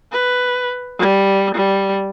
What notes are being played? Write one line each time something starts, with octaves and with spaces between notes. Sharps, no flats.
B4
G3
G3